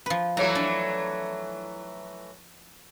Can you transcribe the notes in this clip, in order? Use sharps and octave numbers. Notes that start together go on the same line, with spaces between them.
F3 B4
E3 F#3 A3 A#5
D4